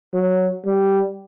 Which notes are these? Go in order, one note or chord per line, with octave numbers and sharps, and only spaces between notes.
F#3
G3